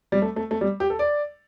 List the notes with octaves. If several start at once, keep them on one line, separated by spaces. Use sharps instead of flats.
G3
A3
A3
A3
G3
G4
A4
D5